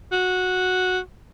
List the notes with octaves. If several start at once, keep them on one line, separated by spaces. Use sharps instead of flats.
F#4